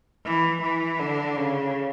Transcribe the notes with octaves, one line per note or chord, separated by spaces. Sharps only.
E3
E3
D3
C#3